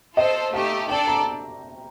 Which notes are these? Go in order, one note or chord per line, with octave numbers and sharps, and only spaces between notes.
F4 A4 C5 D#5
A3 D#4 G4 F5
D4 A4 D5 G5
A#5